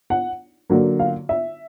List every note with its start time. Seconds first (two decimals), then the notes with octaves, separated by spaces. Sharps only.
0.10 F#5
0.70 D3 F#3 A#3
0.99 F5
1.29 E5